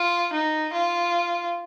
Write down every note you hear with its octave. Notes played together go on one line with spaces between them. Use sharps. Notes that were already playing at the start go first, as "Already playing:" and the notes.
Already playing: F4
D#4
F4